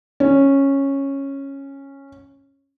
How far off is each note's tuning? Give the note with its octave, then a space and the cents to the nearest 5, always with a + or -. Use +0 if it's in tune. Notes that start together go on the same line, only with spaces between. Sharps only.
C#4 -10